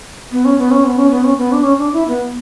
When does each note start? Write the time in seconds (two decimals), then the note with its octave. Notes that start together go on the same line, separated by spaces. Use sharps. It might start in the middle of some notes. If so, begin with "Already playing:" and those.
0.32 B3
0.45 C#4
0.58 B3
0.71 C#4
0.85 B3
0.98 C#4
1.11 B3
1.24 C#4
1.38 B3
1.52 D4
1.63 C#4
1.79 D4
1.93 E4
2.08 B3